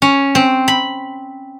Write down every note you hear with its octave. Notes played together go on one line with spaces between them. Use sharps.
C#4
C4
B5